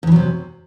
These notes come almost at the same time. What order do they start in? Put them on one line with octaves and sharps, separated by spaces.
E2 E3 F#3 C3